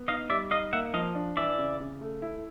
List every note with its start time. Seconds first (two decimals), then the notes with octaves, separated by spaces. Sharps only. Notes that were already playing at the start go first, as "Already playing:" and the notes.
Already playing: B3
0.08 D#4 D#5 F5
0.29 G3 D5 E5
0.51 D#4 D#5 F5
0.72 A#3 E5 F#5
0.94 F3 D#5 F5
1.15 D4
1.37 E3 D5 E5
1.58 C#3
1.80 C#3
2.01 A3
2.22 E4